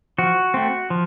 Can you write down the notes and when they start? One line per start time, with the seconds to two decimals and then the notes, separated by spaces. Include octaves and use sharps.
0.18 F3 F#4
0.54 A3 C4
0.90 F3